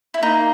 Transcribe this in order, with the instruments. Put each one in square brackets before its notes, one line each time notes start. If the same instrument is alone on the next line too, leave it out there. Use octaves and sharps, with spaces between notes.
[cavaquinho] E4
[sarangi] A#3 [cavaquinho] D#4